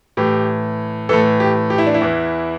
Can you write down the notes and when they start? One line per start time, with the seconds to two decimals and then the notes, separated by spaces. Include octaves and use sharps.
0.17 A2 E3 G4
1.09 A2 E3 A4
1.40 G4
1.70 G4
1.78 E4
1.87 D4
1.94 E4
2.01 E2 E3